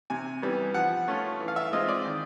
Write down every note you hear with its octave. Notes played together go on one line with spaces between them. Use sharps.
C3 G#5
E3 G3 B3
F3 F#5
A3 C#4 F4
E3
F5
E5
G#3 C4 F4 D#5
D5
D#3